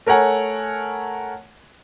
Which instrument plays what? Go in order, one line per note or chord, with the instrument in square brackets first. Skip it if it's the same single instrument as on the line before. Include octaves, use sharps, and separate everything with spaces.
[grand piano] A3 A#4 C#5 F#5 G#5